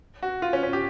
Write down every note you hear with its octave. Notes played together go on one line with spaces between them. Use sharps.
F#4
F4
C#4
C#4
G4